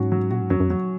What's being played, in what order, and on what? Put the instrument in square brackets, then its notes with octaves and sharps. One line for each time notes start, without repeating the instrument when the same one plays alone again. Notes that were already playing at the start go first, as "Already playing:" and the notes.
Already playing: [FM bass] G#2 [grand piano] F#3 C#4 F#4
[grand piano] F#3
[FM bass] A#2 [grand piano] F#4
[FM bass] G#2
[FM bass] F#2 [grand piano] F#3
[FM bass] F#2
F2
[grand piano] F#3